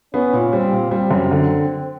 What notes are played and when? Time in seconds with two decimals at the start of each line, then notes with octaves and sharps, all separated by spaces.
0.14 B3 C#4
0.33 A#2
0.53 G3 C4
0.72 A#2
0.91 G3 C4
1.11 F#2
1.31 D3